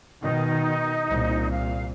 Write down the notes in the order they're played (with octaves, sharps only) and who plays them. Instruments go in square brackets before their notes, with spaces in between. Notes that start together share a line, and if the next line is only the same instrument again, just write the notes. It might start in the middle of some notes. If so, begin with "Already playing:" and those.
[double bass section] B2 D#3 [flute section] D#4
[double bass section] C2 A#2
[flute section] F5